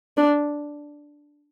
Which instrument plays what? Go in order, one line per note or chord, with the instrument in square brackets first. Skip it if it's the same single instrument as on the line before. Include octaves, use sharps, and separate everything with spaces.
[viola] D4